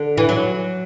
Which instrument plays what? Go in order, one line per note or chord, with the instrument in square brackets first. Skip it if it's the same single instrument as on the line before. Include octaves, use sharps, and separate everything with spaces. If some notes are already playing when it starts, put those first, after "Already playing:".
Already playing: [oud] D3
E3
F#3